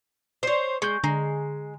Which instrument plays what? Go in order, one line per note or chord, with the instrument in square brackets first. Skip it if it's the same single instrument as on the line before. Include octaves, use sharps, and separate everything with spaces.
[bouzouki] C5 C#5
[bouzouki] G#3 [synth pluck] C#6 G6
[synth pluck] D3 A#5 [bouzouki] G#3